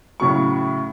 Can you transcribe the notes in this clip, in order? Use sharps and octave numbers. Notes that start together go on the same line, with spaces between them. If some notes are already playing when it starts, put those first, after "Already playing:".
A2 C#3 F#3 C#6